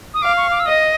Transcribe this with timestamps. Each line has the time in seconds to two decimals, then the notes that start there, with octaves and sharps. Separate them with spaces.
0.14 D#6
0.22 F5 D6
0.37 C#6
0.51 D6
0.60 E6
0.66 D#5 D#6